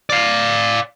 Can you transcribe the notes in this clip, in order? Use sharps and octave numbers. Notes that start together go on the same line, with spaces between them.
D5 F5